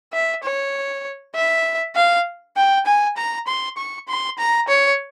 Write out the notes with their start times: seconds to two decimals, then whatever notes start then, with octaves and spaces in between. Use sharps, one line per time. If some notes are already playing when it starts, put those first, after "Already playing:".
0.13 E5
0.43 C#5
1.35 E5
1.96 F5
2.57 G5
2.86 G#5
3.17 A#5
3.47 C6
3.77 C#6
4.08 C6
4.38 A#5
4.68 C#5